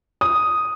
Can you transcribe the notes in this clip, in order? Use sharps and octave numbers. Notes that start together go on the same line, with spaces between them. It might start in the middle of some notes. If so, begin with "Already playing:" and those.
D#6